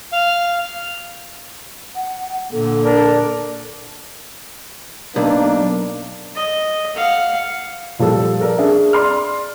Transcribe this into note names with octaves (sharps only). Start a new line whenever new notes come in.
F5
F#5
A#2 D3 A4
D4 A#4
B1 A#3 D4
D#5
F5 F#5
A#2 F3 G3 A4
A4 A#4 D5
D4 G#4 E5
D5 C6 F6